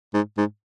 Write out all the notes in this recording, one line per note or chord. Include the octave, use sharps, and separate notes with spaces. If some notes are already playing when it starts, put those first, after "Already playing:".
G#2
G#2